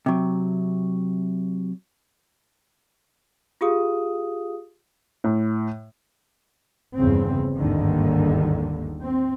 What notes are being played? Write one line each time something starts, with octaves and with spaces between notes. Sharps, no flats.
C3 F#3
F4 G4 G#4 F5 D#6
A2
G1 E2 C#3 C4
G1 D#2 G#2 D3 D#3
C4